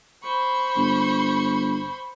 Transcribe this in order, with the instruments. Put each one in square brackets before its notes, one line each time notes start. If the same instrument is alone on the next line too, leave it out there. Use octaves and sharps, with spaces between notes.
[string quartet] C5 B5 C#6
[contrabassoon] G1